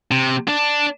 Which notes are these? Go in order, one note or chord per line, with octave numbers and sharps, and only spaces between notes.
C3
D4